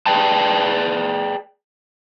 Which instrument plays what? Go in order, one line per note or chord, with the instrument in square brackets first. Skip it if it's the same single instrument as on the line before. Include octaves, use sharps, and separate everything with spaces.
[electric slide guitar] G#4 B4 D5 G5 A5